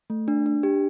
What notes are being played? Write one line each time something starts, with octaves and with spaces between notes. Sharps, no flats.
A3
D4
D4
G4